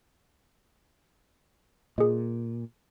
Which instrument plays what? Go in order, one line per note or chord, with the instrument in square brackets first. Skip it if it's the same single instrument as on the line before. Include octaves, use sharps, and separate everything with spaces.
[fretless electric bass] A#2 [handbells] G#4 D#5